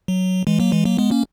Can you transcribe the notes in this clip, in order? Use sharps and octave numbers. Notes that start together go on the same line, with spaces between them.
F#3
E3 G#3
F#3 A#3
E3 G#3
F#3 A#3
G#3 B3
A#3 C#4